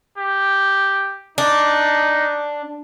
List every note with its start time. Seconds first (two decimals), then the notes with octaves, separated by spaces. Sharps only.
0.18 G4
1.38 D4 D#4